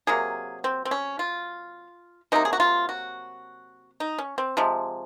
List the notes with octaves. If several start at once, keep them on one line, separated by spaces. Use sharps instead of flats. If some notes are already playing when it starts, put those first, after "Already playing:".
C3 F#3 A#3 G#4
C4
C4
C#4
F4
C3 F#3 A#3 D#4
G#4
F#4
F4
F#4
D#4
C#4
C4
C3 F3 G#3